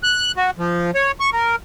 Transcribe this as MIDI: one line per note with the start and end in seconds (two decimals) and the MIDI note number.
0.03 0.32 90
0.37 0.50 66
0.59 0.91 53
0.95 1.12 73
1.20 1.30 85
1.33 1.56 70